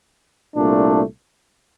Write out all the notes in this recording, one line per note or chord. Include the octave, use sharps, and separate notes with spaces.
C2 A#2 A3 D4